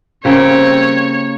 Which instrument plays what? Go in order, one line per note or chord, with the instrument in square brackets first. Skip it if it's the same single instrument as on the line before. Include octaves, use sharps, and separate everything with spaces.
[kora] C#3 A#3 G5 [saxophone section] G3 C4 [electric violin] C#5